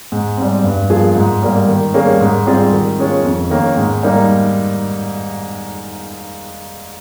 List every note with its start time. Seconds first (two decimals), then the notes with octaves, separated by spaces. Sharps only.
0.12 G#2
0.37 G3 C4
0.63 G2
0.90 F3 A#3 F4 G#4
1.15 G#2
1.43 G3 A#3
1.68 D#3
1.94 G3 A#3 C#4 G#4
2.20 G#2
2.47 G3 C4 F4 G#4
2.73 D#3
2.99 G#3 C#4 F4
3.25 F2
3.50 D#3 A#3 C#4
3.77 G#2
4.03 G3 A#3 D#4